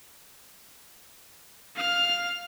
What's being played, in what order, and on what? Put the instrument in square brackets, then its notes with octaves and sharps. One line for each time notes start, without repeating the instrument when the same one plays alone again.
[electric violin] F5 F6